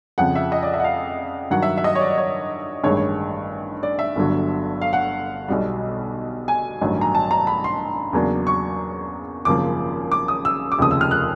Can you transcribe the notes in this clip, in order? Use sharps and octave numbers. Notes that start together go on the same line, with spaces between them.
F2 C#3 F3 F#5
E5
D#5
D5
E5
F#5
F5
G2 D#3 F#3 F#5
E5
E5
D#5
C#5
D5
C#5
A1 G2 D#3 G#3 C#5
C#5
D5
E5
G1 G2 D3 F#3
F5
F#5
B1 B2 G3
G#5
A1 G2 D#3 F#3
A#5
A5
A#5
B5
C6
E2 C#3 F#3 A#3 D4
C#6
G#1 F#2 C#3 F3 A#3 D6
D6
D#6
E6
D6
F1 D#2 C#3 F3 D#6
E6
F6
F#6